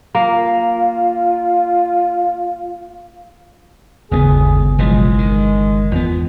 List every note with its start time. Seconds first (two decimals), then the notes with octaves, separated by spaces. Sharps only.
0.15 A#3 F4
4.11 G1 D#2 C#3 A3 B3 G#4
4.78 B1 E3 F3 G#3
5.18 D#3
5.91 E2 B3 F4